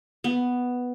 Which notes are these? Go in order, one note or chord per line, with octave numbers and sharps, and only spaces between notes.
B3